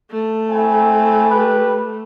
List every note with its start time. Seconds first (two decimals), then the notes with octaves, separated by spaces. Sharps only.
0.11 A3
0.50 C4 E4 G#5
1.30 G4 B4